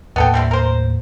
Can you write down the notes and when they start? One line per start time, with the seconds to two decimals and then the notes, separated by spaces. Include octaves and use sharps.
0.16 D#2 A2 A#3 B3 A4 G5
0.34 G3 C4 E4
0.51 A#4 C5